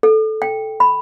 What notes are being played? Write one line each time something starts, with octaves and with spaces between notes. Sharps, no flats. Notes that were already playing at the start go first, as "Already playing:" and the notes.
A4
G5
B5